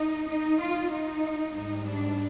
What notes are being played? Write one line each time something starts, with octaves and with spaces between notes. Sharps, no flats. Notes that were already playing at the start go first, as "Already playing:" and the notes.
Already playing: D#4
D#4
F4
D#4
G#2 G3 D#4
D4